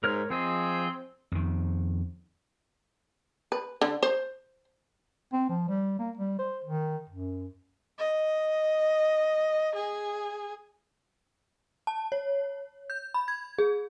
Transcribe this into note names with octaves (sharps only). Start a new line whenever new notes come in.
G#2 A#4 C#5 F6
F3 C4 G#4 D#5
F2 D#3
B4
D3
C5
C4
F3
G3
A#3
G3
C5
D#3
F#2
D#5
G#4
A5
C#5
G6
B5
G#6
G#4